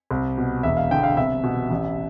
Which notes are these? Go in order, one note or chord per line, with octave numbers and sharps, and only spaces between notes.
C2
B2
E1 E5
F5
E2 D3 G5
F5
C2 E5
B2
A1